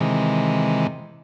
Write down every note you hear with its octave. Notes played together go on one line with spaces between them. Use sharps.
C3 D#3 E3 G#3